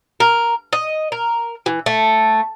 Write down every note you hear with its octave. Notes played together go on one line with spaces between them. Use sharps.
A#4
D#5
A#4
E3
A3